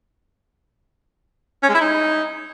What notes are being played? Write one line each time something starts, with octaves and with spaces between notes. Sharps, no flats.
C#4
G#3
E4
D#4